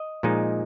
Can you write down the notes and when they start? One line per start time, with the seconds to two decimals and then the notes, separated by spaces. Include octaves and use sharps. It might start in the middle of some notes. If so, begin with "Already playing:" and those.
Already playing: D#5
0.23 A#2 F3 G#3 D#4